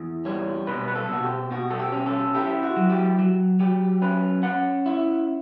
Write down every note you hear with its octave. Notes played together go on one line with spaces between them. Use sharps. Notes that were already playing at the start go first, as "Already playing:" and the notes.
Already playing: E2
G3 C#5
B2 B4
B4
A4
B2 F#4
G4
B2 F#4
A4
G4
C#4
A4
E4 G4
F#4
F#3
G4
F#3
F#3 G4
C#4 B4
C#4 F#5
E4